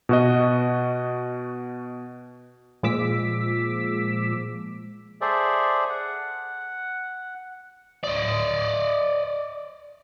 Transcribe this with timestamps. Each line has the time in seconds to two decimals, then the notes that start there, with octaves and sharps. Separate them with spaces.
0.09 B2 F#4 D#5
2.83 A#2 F3 G#3 D6 E6 B6
5.21 G#4 A4 C5 D5 E5
5.89 F#5
8.04 D5 D#5